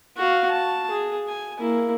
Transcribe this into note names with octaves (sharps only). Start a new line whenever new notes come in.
F#4 F5
A5
G#4
G#5
A#3 E4